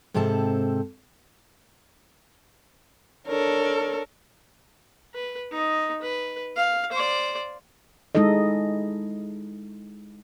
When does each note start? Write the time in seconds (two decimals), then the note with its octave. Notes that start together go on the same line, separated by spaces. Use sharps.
0.14 G#2 C3 C4 A4 A5
3.27 D4 A4 A#4 C#5
5.14 B4
5.52 D#4 D#5
6.02 B4
6.56 F5
6.92 C5 D5
8.15 G#3 D#4 E4 A4 D#5